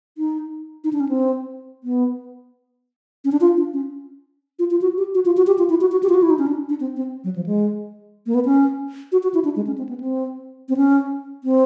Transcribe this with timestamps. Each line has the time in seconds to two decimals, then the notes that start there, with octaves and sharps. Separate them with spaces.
0.18 D#4
0.84 D#4
0.93 D4
1.00 C#4
1.09 C4
1.84 B3
3.25 C#4
3.32 D4
3.41 F4
3.57 D4
3.73 C#4
4.59 F4
4.71 F4
4.81 F#4
4.98 G4
5.15 F#4
5.26 F4
5.37 F#4
5.47 G4
5.58 F4
5.70 E4
5.81 F#4
5.92 F#4
6.03 G4
6.09 F4
6.14 F#4
6.23 E4
6.30 D#4
6.39 C#4
6.47 D4
6.69 D4
6.80 C4
6.96 C4
7.24 F#3
7.36 F3
7.46 G#3
8.26 A#3
8.34 B3
8.45 C#4
9.12 F#4
9.23 F#4
9.34 E4
9.44 D4
9.56 G#3
9.67 C#4
9.78 C4
9.89 B3
10.00 C4
10.69 C4
10.77 C#4
11.44 C4